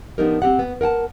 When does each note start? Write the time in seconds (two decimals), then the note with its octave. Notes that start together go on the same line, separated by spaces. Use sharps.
0.18 F3 B3 D4 D#4 G4 A#4
0.42 C4 G4 F#5
0.59 B3
0.81 A#4 F#5 G5 A5